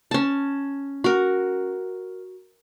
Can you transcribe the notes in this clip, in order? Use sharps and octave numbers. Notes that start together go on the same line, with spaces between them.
C#4 A5
F#4 A#4